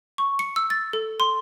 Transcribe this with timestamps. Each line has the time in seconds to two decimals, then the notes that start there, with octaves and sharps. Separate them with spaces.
0.18 C#6
0.39 C#7
0.56 E6
0.70 A6
0.93 A4
1.20 C6